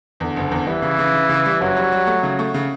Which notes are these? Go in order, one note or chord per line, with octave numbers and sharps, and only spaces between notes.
E2 D3
F#1
E2
E3 G3
C#3
C#3
C#3
C#3
G3
F#1 F#3
G3
G3
A3
C#3
A3
C#3